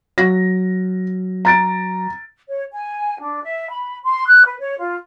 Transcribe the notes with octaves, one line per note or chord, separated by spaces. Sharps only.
F#3 A#6
A#5 A6 D7
C#5
G#5
D4
E5
B5
C6
F#6
B4
C#5
F4